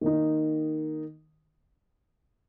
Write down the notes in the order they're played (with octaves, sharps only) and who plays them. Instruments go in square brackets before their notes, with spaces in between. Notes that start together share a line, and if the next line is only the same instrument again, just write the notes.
[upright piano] D#3 A#3 D#4